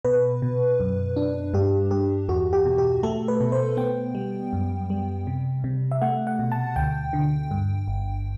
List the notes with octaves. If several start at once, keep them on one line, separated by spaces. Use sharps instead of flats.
B2 B4
B2
F#2
D4
G2 G4
G2 G4
E2 F#4
G4
B2
G4
A3 A4
B4
B2
C5
B3 G5
G3
F#2
G3
C3
C3
E5
A3 F#5
F#5
B2
A5
D2 G5
D3
G2
G1